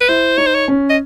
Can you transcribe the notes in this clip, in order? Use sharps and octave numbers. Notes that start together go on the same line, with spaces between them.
B4
E4 C5
D#4 C#5
C5
C#5
C#4
D#5